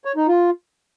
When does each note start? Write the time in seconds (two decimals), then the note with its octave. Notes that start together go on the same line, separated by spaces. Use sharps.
0.05 C#5
0.16 D#4
0.28 F4